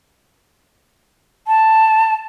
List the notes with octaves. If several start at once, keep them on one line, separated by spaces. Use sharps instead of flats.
A5